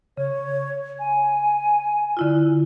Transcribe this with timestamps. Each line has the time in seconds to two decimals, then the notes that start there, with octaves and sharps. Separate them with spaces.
0.17 C#3 C#5
0.99 G#5
2.17 D3 E4 F4